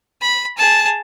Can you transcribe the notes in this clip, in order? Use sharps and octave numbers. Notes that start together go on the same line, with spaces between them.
B5
G#4 A5